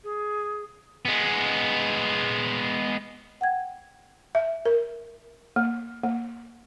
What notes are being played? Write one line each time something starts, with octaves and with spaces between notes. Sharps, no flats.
G#4
G#3 B3
F#5 G5 G#6
E5
A#4
A#3
A#3